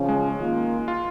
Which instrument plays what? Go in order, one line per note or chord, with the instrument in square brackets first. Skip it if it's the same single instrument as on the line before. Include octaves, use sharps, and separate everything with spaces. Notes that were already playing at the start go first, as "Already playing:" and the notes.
Already playing: [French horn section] C#3 F3 C#4
[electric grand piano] G#3
[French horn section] D#3 A#3 F4
[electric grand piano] F4